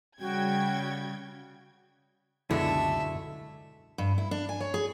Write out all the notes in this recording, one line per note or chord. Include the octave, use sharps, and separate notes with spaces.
C#3 G3 F#4 G5 G#6
C#2 F#2 B2 D3 G#3 A3 E4 E5
G2
E4
D4
G#5
C#5
G#4